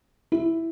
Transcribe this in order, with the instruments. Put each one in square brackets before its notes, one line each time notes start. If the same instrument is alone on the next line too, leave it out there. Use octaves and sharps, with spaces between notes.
[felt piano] E4